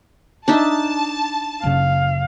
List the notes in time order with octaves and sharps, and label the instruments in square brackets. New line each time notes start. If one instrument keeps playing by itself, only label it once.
[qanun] D4 D#4 E5 [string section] A5
[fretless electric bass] F#1 C#3 [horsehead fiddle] F5